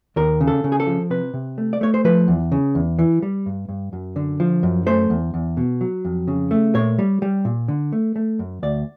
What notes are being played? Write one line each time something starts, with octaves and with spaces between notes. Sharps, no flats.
D#2 A#4
C#3
A4
C#3
G#4
A4
F3
C3 B4
C3
A3
D5
A3 C#5
C5
F3 B4
E2
C#3
E2
E3
G3
G2
G2
F#2
D3
F3
F#2
A3 C5
E2
E2
B2
F#3
F2
C#3
A3
A#2 C#5
G3
G3
A#2
D3
A3
A3
F#2
D2 D5